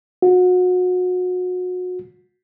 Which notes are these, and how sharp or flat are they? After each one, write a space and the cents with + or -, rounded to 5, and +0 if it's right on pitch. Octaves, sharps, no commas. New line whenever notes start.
F#4 -30